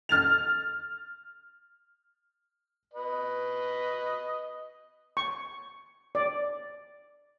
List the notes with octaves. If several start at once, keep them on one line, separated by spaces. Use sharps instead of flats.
F6 A6 F7
B4 D#5
C#6
D5